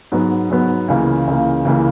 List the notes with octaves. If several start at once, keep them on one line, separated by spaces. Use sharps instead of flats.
G#2 F#3 B3
G#2 F#3 B3
C#2 C#3 E3 A#3
C#2 C#3 E3 A#3
C#2 C#3 E3 A#3